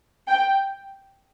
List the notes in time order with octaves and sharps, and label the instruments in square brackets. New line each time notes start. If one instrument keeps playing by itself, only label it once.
[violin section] G5